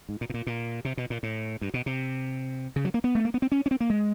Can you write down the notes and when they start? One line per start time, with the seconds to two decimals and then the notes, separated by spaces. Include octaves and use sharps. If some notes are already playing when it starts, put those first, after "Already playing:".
0.09 G#2
0.21 A#2
0.30 B2
0.34 A#2
0.47 A#2
0.85 C3
0.97 B2
1.10 A#2
1.23 A2
1.61 G2
1.74 B2
1.86 C3
2.76 C#3
2.85 F#3
2.94 A#3
3.04 B3
3.15 A3
3.25 A#3
3.34 B3
3.42 C4
3.52 C#4
3.66 C#4
3.71 C4
3.80 A#3
3.90 G#3